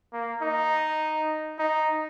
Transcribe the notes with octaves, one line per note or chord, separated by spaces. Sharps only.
A#3
D#4
D#4